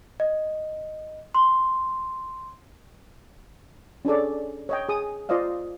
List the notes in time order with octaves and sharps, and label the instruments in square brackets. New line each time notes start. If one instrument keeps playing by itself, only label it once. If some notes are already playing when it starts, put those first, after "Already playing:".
[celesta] D#5
C6
[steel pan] C#4 D4 G#4 A4 D5
C#5 D#5 G5
G#4 D#6
F4 C5 D5 D#5 F5